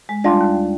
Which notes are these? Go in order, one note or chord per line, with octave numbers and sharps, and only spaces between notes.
G#3
G3 D4 F4
D#2